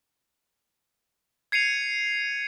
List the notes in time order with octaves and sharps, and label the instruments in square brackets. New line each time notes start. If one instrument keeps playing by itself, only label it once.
[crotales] G#6 C7 C#7 D#7 F7